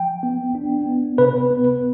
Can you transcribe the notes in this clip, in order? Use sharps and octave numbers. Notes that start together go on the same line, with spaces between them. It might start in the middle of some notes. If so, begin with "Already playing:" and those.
Already playing: F3 G5
B3
D4
B3
C3 B4
B3